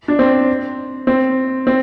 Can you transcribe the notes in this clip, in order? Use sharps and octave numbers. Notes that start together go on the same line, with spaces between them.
D4
C4
C4
C4